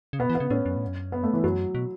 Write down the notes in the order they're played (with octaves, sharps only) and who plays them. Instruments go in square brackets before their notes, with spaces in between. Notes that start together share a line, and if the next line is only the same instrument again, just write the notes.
[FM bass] C#3
[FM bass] B2 [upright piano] B3
[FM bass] E3
[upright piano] B3
[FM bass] C#3
[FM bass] A2 [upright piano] C#4
[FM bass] F#2
A2
F#2
[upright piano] B3
A3
E3
[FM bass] F#2 [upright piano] F#3
[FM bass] B2